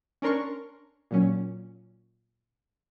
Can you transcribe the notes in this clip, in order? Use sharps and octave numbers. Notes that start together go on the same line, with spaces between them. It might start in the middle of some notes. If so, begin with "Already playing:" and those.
C#4 D4 A#4 C6 C#6
A#2 F#3 C#4